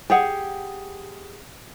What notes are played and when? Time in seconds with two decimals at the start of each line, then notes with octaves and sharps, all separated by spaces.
0.10 G4 G#4 F#5